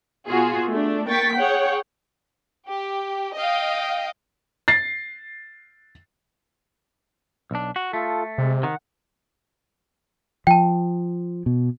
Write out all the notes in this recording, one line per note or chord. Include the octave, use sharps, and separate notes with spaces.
B2 F4 F#4 G#4
A3 D4
A#3 G5 C#6 A6 B6
G#4 C#5 F#5 G5
G4
D#5 F5 G5
A6 C7
B1 D4
F#4
A3 F4 A4
C3 G#3
D#3 F#5
F3 G5 A5
B2